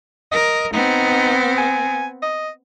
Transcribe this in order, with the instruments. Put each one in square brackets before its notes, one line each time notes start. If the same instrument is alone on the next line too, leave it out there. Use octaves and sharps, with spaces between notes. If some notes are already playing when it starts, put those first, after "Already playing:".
[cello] A#4 [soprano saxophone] D#5
[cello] B3 C4 [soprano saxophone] D#4
[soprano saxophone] G#5
D#5